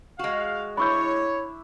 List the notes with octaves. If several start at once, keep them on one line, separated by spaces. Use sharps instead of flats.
G#3 F#4 F5
D4 E4 C#5 E5 B5 C#6 G6